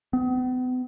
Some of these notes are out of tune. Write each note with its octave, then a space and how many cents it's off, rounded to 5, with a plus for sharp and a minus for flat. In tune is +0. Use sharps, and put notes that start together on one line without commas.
B3 +40